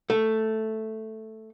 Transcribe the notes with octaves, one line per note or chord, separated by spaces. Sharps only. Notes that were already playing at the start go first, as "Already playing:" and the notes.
A3